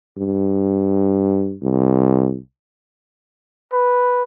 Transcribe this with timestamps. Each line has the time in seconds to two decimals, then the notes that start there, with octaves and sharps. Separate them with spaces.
0.18 G2
1.62 C2
3.73 B4